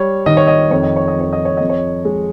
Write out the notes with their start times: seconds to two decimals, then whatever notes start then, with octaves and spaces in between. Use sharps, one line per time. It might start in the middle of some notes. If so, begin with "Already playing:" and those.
Already playing: G3 C#5
0.26 D#3 D#5
0.37 C#5
0.47 D#5
0.71 F2 C#5
0.83 D#5
0.96 C#5
1.08 D#5
1.16 F2 C#5
1.33 D#5
1.45 C#5
1.57 F2 D#5
1.70 C#5
2.05 G#3